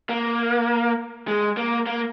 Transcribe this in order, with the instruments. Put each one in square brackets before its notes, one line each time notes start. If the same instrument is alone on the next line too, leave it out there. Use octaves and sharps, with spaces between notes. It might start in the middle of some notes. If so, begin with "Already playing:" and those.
[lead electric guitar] A#3
G#3
A#3
A#3